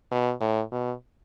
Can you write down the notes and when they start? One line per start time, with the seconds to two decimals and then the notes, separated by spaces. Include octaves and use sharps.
0.11 B2
0.41 A2
0.72 B2